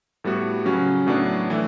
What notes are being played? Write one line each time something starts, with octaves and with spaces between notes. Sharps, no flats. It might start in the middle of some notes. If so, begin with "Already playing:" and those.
A2 G3 B3 F#4
C#3 F#3 C#4 F#4
A2 F#3 B3 D4
E3 A3